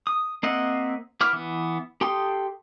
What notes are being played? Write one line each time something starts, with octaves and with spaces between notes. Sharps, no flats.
D#6
A#3 C4 D#5 E5 F#5
B3 E4 D6 F6
E3 B3
G4 A4 G5 C6 D#6